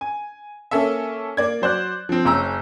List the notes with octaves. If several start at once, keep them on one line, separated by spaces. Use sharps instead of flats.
G#5
A#3 C#4 A4 E5
A#3 D5 G#6
F#3 C5 D5 F#6
F3 C4
F#1 C#4 A#5 E6